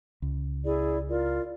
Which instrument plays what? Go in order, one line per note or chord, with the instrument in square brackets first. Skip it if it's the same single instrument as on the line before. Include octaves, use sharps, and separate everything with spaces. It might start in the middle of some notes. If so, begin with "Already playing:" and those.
[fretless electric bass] C#2
[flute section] E4 G#4 D5
F4 A#4 D5